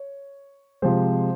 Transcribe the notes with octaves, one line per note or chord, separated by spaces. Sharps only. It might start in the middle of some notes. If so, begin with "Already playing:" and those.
Already playing: C#5
C3 F3 G#3 C5